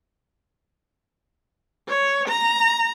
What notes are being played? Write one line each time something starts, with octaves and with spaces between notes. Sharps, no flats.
C#5
A#5